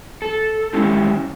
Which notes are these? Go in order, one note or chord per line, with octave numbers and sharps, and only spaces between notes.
A4
G#3 C#4 E4 G4